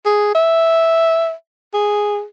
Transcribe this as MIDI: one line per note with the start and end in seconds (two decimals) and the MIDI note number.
0.05 0.33 68
0.35 1.32 76
1.74 2.24 68